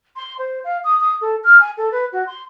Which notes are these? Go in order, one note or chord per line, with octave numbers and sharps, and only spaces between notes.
C6
C5
F5
D#6
D#6
A4
F6
G#5
A4
B4
F#4
C6